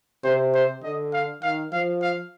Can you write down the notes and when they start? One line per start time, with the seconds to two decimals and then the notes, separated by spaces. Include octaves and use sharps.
0.24 C3 C5
0.54 C5
0.83 D3 D#5
1.13 F5
1.43 D#3 F5
1.72 F3 F5
2.02 F5